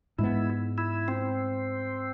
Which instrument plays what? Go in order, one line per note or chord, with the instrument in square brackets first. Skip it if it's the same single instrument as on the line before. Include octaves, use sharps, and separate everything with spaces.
[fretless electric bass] G#2 G#3 B3 [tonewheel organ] E4
[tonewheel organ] E4
C4